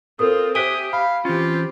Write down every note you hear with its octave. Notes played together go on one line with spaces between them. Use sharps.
C4 F4 A4 A#4 D#6
G4 C5 E5 G5 G#5 D#6 F#6 G7
F5 B5
E3 C4 C#4 F4 G4